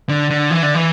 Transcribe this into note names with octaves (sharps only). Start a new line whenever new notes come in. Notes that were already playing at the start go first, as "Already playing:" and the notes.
D3
D3
E3
D3
E3